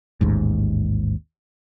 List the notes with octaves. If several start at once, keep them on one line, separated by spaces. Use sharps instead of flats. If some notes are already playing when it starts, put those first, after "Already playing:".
A1 D#2 G#2